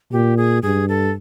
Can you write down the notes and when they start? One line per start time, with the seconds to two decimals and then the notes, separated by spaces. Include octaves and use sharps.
0.12 A#2 G4
0.37 G#4
0.63 G2 G#4
0.89 A4